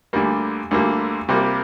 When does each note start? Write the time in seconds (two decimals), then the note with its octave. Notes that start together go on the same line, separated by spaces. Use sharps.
0.13 D2 D3 G3 A#3
0.71 D2 D3 G3 A#3
1.29 C2 C3 G3 A#3